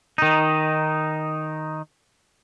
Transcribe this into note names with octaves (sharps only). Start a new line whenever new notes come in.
D#3 D#4